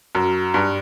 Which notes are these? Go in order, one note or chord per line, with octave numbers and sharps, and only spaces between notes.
F#2
G2